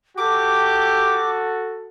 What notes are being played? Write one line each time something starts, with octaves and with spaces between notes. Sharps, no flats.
F#4 G4 A4 D6